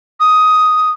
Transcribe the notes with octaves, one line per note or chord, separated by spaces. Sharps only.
D#6